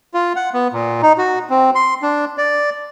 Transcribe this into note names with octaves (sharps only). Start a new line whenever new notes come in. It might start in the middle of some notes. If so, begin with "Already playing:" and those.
F4
F#5
B3
A#2
D#4
F#4
C4
C6
D4
D5